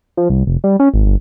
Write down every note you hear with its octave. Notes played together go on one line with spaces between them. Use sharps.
F3
C2
F1
G3
C#4
G#1
G1